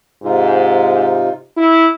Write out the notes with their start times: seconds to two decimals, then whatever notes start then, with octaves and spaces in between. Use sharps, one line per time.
0.24 G#2 C3 D#4 F4
1.57 E4